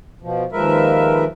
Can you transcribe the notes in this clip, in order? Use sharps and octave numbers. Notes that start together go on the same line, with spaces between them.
B2 F3
D#2 F3 G#3 A#4 B4 E5